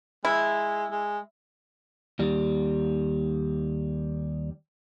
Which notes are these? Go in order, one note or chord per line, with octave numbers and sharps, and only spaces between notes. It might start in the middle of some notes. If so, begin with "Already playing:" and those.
G#3 E4
G#3
D#2 G3